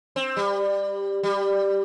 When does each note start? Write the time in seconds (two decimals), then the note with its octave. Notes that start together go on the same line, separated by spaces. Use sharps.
0.16 C4
0.37 G3
1.23 G3